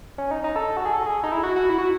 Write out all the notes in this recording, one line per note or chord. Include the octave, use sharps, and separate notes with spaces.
C#4
D#4
D#4
A4
F#4
G#4
A4
G#4
D#4
E4
F#4
F#4
E4
F#4